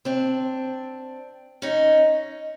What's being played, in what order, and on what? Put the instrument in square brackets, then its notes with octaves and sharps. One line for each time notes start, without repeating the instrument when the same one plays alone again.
[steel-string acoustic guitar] C4 D4
C#4 D#4